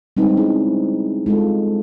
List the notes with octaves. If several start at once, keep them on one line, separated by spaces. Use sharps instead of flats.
G3 G#3 C4 D#4 B4
C#4 E4 G#4
G#3 F4 A4